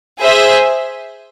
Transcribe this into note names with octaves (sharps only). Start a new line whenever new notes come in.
G#4 C5 E5